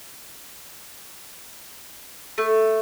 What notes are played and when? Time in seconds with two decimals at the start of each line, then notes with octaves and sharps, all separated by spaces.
2.38 A3